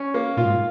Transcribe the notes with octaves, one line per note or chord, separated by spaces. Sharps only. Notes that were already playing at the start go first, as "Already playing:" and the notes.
Already playing: C#4
A#3
A#2 F4
G#2